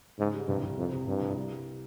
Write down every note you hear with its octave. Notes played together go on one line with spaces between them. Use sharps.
G#2 C#3
G3
C2 G2
C2
F2 C4
C3
C2 G2
C2
G3
G3